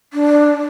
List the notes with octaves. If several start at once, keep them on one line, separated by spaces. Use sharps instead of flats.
D4